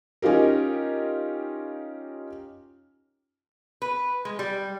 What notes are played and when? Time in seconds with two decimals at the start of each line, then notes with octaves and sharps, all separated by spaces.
0.22 C#4 D#4 F4 G4 A#4
3.82 B4
4.25 G#3
4.39 G3